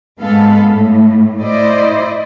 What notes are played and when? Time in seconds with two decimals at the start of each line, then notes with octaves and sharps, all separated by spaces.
0.19 G#2 G#3 B3 A4 F5
0.67 A2
1.41 E4 C5 D5 D#5